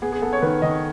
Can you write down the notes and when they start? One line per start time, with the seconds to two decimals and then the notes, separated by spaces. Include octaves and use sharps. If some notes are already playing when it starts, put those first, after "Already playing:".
0.02 B3 G#4
0.12 G#4
0.22 B3 A4
0.33 C#5
0.42 D#3 B4
0.62 D#3 D#5